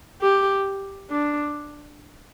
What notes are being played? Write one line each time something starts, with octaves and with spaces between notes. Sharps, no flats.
G4
D4